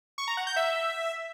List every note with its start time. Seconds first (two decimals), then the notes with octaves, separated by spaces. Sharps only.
0.18 C#6
0.28 A#5
0.37 F#5
0.47 G6
0.56 E5